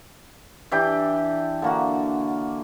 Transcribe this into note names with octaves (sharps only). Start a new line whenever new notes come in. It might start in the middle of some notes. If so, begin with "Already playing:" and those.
E3 D4 G4 G5
D3 A#3 F#4